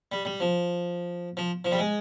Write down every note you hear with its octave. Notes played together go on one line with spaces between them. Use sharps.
G3
G3
F3
F3
F3
G3
G#3